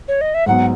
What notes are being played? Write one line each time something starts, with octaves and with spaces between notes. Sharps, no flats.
C#5
D#5
E5
G#2 F#3 B3 F#5